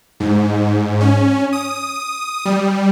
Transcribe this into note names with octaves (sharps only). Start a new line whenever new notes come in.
G#2
C#4
D#6
G3